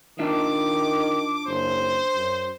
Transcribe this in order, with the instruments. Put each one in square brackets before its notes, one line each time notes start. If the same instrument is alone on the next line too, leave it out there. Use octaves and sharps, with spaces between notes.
[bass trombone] D#3 [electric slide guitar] D4 F4 E5 [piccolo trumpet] D6
[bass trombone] F#1 [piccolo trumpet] C5
[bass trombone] F#2